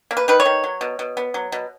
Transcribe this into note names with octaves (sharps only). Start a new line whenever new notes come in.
A#3
B4
D#3 B4
C#5
D#3
F#3
B2
B2
B3
F#3
B2